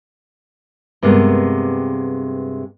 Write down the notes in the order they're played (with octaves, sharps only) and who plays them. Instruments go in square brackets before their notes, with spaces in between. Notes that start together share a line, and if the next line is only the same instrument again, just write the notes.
[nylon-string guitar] G2 C3 G#3 A#3 B3